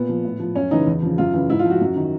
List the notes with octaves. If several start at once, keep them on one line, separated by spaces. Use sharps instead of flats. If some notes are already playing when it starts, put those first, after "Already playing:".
Already playing: A#2 B3
F3
A2
F3
F#2 C#4
C#3 E3 D#4
E2
C#3 F3
F#2 F4
C#3 E3
G#2 E4
F4
F3
F#4
F#2
D#3